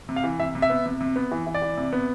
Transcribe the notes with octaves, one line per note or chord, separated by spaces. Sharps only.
C3
F5
E3
C3 E5
C3
E5
B3
C3
C3
B3
E3
E3
D5
E3
C3
B3